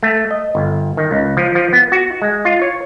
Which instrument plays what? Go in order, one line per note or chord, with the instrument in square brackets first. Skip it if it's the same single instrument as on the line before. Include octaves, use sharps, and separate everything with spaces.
[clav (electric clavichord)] A3
D#5
G1
D#3
C#2
F3
F3
B3
F#4
G#3
F4
C#5